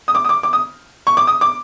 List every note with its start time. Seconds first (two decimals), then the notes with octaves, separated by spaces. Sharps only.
0.08 D#6
0.15 D6
0.25 D#6
0.29 D6
0.43 D6
0.53 D#6
1.07 C#6
1.17 D6
1.27 D#6
1.41 D6